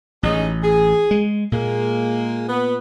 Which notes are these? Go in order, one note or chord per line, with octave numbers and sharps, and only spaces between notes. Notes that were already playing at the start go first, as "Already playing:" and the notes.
A1 G#3 C#4 D#4
G#4
G#3
A#2 G#3 A#3
B3